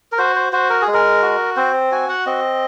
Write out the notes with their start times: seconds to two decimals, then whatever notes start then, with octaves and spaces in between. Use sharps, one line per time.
0.12 A#4
0.18 F#4 C5
0.36 C5
0.53 F#4 C5
0.70 A#4
0.82 G#4
0.88 G#3
0.94 A#4
1.22 F#4
1.56 C4 C5
1.92 F#4 G#5
2.09 F#5
2.26 C4 D#5